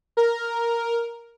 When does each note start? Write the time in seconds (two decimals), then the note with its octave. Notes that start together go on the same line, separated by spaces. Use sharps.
0.17 A#4